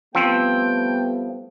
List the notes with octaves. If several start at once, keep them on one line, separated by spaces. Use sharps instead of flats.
F3 G3 A3 B3 C4 G5